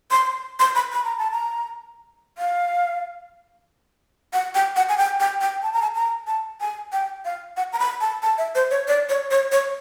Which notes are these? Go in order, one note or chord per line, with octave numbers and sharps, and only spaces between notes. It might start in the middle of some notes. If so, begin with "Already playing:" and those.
C6
C6
B5
B5
A#5
A5
A#5
F5
F#5
G5
F#5
G#5
G5
G5
G5
A5
A#5
A5
A#5
A5
G#5
G5
F5
F#5
A#5
B5
A5
A5
E5
C5
C#5
D5
C#5
C#5
C#5